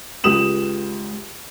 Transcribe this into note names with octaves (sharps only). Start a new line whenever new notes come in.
C#2 G4 D#6 E7 F#7